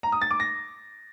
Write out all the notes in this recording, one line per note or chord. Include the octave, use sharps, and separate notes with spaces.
A#5
D#6
A6
D6
A#6